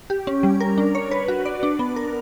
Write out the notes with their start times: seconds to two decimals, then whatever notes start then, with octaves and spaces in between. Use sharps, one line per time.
0.10 G4
0.27 C#4
0.43 G3
0.61 A#4
0.78 D4
0.95 C#5
1.11 B4
1.28 F#4
1.46 D5
1.63 D4
1.79 B3
1.96 A#4